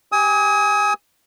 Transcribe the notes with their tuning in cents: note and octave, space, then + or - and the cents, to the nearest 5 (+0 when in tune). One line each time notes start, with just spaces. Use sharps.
G4 +0 G#5 -10 D#6 +35